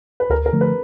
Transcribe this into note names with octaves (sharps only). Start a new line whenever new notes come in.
B4
D2 A#4
A#4
D3 F3 A3
B4